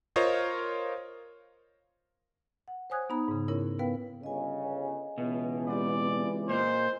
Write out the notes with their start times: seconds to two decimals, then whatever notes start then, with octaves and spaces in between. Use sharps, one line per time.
0.16 F4 A#4 C5 C#5 D#5 F5
2.68 F#5
2.90 C5 C#5 G#5 D#6 F#6 G#6
3.09 B3 D#4 A#5 B5
3.28 G#2 C#3
3.48 C#4 E4 A#4 C#5
3.79 B3 B4 F5 G5
4.23 G1 C#3 D#5 G#5
5.18 C#2 B2 E3
5.67 G#3 C4 G4 D5
6.49 A#2 C5 D#5